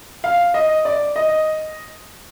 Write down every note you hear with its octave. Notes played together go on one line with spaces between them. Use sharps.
F5
D#5
D5
D#5